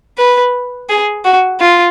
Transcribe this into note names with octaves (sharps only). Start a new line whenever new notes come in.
B4
G#4
F#4
F4